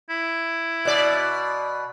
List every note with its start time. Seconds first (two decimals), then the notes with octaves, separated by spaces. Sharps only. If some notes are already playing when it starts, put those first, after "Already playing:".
0.10 E4
0.85 B2 D5